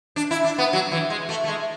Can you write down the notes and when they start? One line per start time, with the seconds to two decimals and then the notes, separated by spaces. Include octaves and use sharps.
0.16 D4
0.31 E4
0.44 D4
0.58 B3
0.73 F#3
0.92 E3
1.10 G#3
1.29 A3
1.44 A3
1.48 G#3